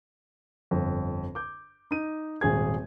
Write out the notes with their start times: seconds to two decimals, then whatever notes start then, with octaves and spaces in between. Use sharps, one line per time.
0.71 G1 F2
1.35 D6 G6
1.91 D#4 D#7
2.41 D#1 G#1 G#4 G#6